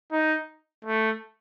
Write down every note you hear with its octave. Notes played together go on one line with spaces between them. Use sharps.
D#4
A3